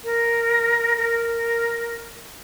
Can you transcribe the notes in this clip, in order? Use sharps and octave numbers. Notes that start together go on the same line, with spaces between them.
A#4
A#4